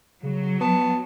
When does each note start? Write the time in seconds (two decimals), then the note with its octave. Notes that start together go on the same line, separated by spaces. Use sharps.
0.23 C#3 F#3
0.61 B3 A5